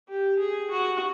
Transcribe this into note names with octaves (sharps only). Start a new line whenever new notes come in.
G4
G#4
F#4